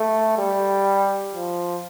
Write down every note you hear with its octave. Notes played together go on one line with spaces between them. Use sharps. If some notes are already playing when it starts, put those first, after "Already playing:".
Already playing: A3
G3
F3